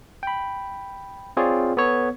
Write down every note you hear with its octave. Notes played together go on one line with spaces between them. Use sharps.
G5 B5
C4 F4 G#4 C#5 D5
B3 A4 C#5